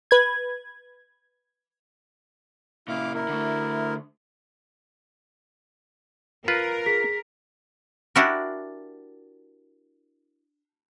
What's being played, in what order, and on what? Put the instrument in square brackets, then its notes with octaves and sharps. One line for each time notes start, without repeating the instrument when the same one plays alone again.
[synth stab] B4 G#6
[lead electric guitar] A#2 C#3 [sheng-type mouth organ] E4 F5 D6
[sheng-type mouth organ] E4 A#4
[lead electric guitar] D3 A3
[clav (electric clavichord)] F4 B4 [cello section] A#4
[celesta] G#4 B6
[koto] D4 E4 F#4 G4 A#4